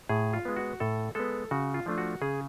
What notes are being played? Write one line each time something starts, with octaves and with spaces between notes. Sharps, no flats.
A2 G#4
F4
G#3 B3
F#4
A2 A4
G#3 B3 A4
C#3 F#4
F4
F3 A3 D4 F4
F#4
C#3 G#4